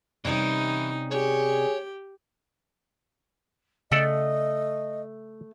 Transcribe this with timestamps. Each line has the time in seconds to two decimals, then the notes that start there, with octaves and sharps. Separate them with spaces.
0.25 C3 E3 G3 C#4 D#4
1.12 G4 G#4 C#5
3.92 C#3 A3 A4 D5 D#5 F#5